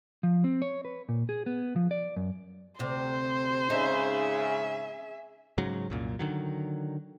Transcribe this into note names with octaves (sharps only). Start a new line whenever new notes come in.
F3
C4
C#5
B4
A#2
G#4
B3
F3
D5
F#2
D2 C3 C5
G#2 C#3 D#4 G#4 E5
G#2 C#3 F#3
C2 F#2 A#2
D3 D#3 F#3